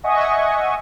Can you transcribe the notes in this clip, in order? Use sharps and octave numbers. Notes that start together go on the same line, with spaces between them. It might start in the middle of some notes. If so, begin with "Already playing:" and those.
D#5 E5 F#5 G#5 C#6 D#6